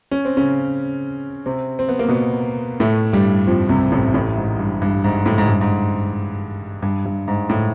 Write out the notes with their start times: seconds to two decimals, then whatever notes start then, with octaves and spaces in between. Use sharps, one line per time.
0.11 C#4
0.25 C4
0.37 C#3 C#4
1.46 C3 C4
1.79 C4
1.89 B3
1.99 A#3
2.08 B2 B3
2.80 A2 A3
3.13 G2 G3
3.47 F2 F3
3.69 C2 C3
3.92 A1 A2
4.14 A1 A2
4.37 G#2
4.59 G2
4.82 G2
5.04 G#2
5.26 A2
5.38 G#2
5.49 G2
5.61 G#2
6.82 G2
7.05 G2
7.28 G#2
7.49 A2